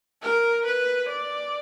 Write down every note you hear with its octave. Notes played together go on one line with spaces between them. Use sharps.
A#4
B4
D5